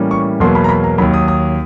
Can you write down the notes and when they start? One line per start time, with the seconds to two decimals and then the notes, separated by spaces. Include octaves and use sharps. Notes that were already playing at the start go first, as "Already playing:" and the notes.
Already playing: A2 E3 G3 A#3 C#4
0.11 C#6
0.40 E2 B2 F#3 A#3 C6
0.55 B5
0.64 A#5
0.69 B5
0.84 A#5
0.98 D#2 D#3 F#3 B5
1.14 D#6
1.28 D#6